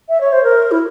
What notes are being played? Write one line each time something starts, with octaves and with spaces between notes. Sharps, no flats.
E5
C#5
C5
A#4
E4